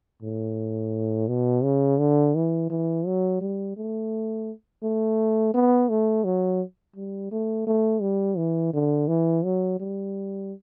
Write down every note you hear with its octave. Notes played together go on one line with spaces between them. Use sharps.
A2
B2
C#3
D3
E3
E3
F#3
G3
A3
A3
B3
A3
F#3
G3
A3
A3
G3
E3
D3
E3
F#3
G3